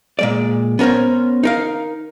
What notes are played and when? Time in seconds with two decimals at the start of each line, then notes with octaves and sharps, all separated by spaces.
0.19 A#2 G#3 D5
0.79 B3 C#4 A#4 C5 C#5
1.43 D#4 A#4 F5